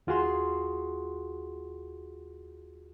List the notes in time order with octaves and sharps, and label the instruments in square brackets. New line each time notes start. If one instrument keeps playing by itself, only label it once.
[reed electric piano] D#2 F4 F#4 G#4 C6